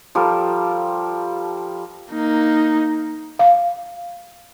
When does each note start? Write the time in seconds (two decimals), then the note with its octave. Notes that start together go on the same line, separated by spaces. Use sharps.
0.15 F3 G3 A4 A#4
2.12 A#3 D#4
3.39 F5